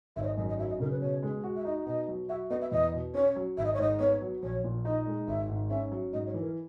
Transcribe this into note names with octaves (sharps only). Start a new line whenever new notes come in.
G#1 E5
C#5
D#5
F#2 D#5
D#5
F#3 E5
D#5
C#3 A#4
B4
B2 C#5
G#3
F#4
E5
D#4 D#5
B2 D#5
F#3
F#4 E5
B3 D#5
E5
E2 D#5
B2
C#4 C#5
F#3
G#1 E5
D#5
C#5
G#2 D#5
B3 C#5
F#3
A#1 C#5
A#2
D#4 D#5
G#3
G#1 E5
G#2
C#4 E5
F#3
G#2 D#5
C#5
E3
A#4